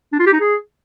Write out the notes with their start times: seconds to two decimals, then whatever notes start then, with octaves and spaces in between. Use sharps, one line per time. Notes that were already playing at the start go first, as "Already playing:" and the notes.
0.12 D4
0.19 F4
0.26 G4
0.33 D#4
0.40 G#4